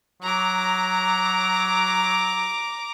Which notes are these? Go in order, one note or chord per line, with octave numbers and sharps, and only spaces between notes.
F#3 A#5 D6